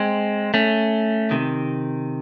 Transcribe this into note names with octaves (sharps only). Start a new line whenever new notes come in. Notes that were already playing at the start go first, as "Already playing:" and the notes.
Already playing: G#3 C4
A3 C#4
C3 D#3